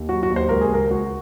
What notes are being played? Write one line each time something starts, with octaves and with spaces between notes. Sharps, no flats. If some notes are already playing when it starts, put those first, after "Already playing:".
Already playing: D#2
F#3 F#4
F#4
D#2
C5
C#2 A#4
G#4
C#2 A#4
C#2 F#4